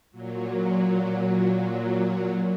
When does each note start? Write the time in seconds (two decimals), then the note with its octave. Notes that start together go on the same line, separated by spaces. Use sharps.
0.11 A#2 F#3